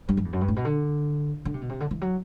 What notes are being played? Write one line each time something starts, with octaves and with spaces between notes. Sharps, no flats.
G2
F#2
E2
F#2
G2
A2
B2
D3
D3
C3
B2
C3
D3
E3
F#3